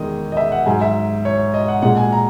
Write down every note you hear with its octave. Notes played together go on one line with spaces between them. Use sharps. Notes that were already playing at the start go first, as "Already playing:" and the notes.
Already playing: E2 D#3 G#3 D#5
D#5
E5
F#5
G#2 F#3 G#5
E5
C#5
D#5
F#5
A#2 G#3 F#5
G#5
A#5